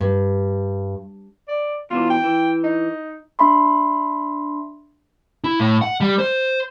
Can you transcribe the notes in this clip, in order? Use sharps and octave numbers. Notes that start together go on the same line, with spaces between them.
G2
D5
E2 B2 E3 F4
G5
E3
D#4
D4 E5 B5 C6
E4
A2
F#5
G3
C5